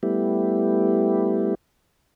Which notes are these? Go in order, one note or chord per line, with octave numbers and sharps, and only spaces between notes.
G3 A3 B3 E4 G4